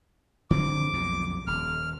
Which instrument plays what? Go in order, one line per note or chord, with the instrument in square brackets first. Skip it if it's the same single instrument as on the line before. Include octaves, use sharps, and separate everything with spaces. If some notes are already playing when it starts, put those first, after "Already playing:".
[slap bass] D3 C4 [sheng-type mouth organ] D6
[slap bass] B1 F2 A#2
[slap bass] D#1 [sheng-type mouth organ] F6